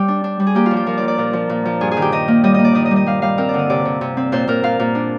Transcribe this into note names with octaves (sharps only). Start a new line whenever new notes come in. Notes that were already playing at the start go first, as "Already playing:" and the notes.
Already playing: G3 G4
D4
D4
G3
G#4
A#3 G4
F4
F3
G4
F3 A#4
F3 D5
D5
A#2 A#4
F3
A#2
F3
G2 G#4
G#4
D#3
G4
D#3 D#5
A#3
G3 D#5
A#3 D#5
D5
D#3 D#5
D#5
G3
D#5
G3 F5
G3 F5
C4 A#4
D3 D5
D#5
C3 D5
C3
C3
C4
A#2 C5
A#2 A#4
A#2 F5
A#2
D4